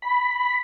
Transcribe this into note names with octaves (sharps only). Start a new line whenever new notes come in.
B5